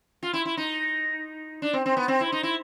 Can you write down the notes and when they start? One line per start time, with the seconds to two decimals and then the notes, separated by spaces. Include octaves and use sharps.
0.23 F4
0.33 E4
0.45 E4
0.57 D#4
1.62 D4
1.73 C4
1.86 C4
1.97 B3
2.08 C4
2.21 E4
2.32 D#4
2.43 E4